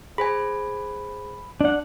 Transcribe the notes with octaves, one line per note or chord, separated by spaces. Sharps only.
G#4 C5 G#5 B5
D4 F#5